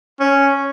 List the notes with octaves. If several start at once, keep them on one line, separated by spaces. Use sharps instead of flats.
C#4